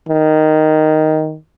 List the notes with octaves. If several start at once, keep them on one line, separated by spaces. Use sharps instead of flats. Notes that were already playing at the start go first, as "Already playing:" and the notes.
D#3